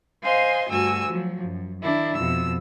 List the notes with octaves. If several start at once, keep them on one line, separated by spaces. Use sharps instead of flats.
C5 D#5 F5 G#5 C6
D2 G2 F#4 G#5 E6
F3 F#3
F#2
D#3 D4 E4
F2 B2 E6